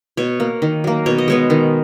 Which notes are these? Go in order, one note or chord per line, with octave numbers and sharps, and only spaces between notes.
B2 C#5
A#3
D#3
F#3 A#3
B2 C#5
D#5
G#3 B3 C#5
D#3